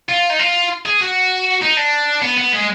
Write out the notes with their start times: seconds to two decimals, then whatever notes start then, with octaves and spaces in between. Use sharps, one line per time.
0.09 F4
0.30 D#4
0.39 F4
0.85 G#4
1.00 F#4
1.62 D#4
1.76 D4
2.22 B3
2.38 B3
2.53 G#3